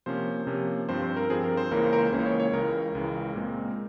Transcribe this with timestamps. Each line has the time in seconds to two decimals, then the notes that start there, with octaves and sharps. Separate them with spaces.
0.06 C3 F3 A#3 C#4 C5
0.47 C3 F3 A#3 C#4
0.89 G2 F3 C4 C5
1.02 C5
1.16 A#4
1.30 G2 F3 C4 G#4
1.44 A#4
1.57 C5
1.71 C#2 C#3 E3 A#3 C#4 A#4
1.84 C5
1.93 A#4
1.98 C5
2.12 C#2 C#3 E3 A#3 C#4 C5
2.26 C#5
2.40 C#5
2.53 C#2 C#3 E3 A#4
2.95 C#2 C#3 E3
3.35 A#2 G#3 C4